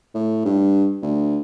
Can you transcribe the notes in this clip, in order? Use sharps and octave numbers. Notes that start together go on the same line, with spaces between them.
A2
G2
D2